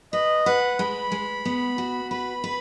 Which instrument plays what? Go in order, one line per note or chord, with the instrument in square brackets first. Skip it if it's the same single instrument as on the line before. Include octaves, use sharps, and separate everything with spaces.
[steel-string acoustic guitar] B4 [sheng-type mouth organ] D#5
[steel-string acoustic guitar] B4 [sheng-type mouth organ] F#5
[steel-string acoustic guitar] G#3 [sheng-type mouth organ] B5
[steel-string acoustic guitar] G#3
B3
F#4
[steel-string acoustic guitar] B4 [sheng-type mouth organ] B5
[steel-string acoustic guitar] B4